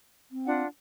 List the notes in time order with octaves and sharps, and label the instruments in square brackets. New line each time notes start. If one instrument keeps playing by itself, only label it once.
[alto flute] C4
[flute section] D4 F4 F#5